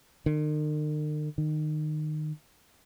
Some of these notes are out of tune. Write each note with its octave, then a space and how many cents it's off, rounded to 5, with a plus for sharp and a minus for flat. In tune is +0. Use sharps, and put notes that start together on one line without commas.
D#3 -45
D#3 -25